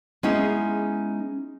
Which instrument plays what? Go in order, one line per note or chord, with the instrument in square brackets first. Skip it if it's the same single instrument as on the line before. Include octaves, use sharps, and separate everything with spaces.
[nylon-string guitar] G#3 B3 C#4 D#4 E4 G#4